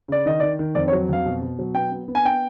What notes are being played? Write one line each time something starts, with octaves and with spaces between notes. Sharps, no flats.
C#3 D5
D#3 D#5
D#3 D5
D#3
F2 D5
C#5
F#3
F2 F5
B2
B2
F#3
B3 G5
B3
B3
G#5
G5